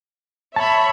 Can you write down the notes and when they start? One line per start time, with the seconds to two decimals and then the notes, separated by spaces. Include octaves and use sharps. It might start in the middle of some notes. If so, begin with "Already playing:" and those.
0.56 C#5 E5 A5 B5